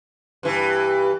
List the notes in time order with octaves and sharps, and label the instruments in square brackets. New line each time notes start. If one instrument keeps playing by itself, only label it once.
[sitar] G2 E3